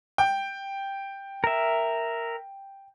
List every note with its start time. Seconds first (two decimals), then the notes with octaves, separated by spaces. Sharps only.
0.18 G5
1.44 A#4 E5